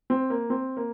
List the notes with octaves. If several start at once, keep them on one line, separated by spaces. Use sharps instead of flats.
C4
A#3
C4
A#3